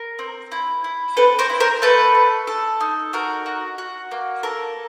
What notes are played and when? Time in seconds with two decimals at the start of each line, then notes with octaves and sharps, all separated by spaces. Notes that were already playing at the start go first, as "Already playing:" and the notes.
Already playing: A#4
0.19 C4
0.52 E4
0.84 E4
1.17 C4 A4 B4
1.39 A#4 C5
1.50 E4
1.60 A#4 C5
1.82 A3 A4 B4
2.15 A3
2.47 A4
2.81 D#4
3.13 F#4 A#4
3.46 F#4
3.78 F#4
4.11 A#3
4.43 A4 A#4